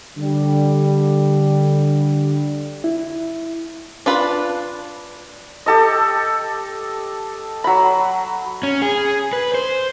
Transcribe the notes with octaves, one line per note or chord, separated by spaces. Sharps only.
D3 G3
E4
D4 F4 B4
G4 A4 D#5
F#3 B5
C#4
G#4
B4
C5